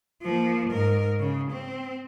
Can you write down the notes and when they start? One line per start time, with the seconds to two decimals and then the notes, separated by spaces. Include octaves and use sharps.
0.23 F3 A#3
0.71 G#2 A#4
1.20 C#3
1.52 C4